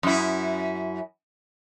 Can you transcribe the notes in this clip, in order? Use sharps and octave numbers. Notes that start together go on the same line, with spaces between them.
F#2 E4